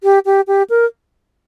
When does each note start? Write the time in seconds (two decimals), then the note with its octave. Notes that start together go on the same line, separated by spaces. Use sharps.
0.03 G4
0.26 G4
0.47 G4
0.70 A#4